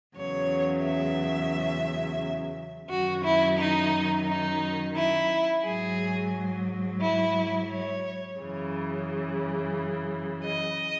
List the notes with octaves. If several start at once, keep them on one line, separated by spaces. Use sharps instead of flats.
E2 C#3 F#3 C#5
E5
F#2 D#3 F#3 F#4
E4
D#4
D#4
E4
G#2 F#3 G#4
E4
C#5
F#2 C#3 E3
D#5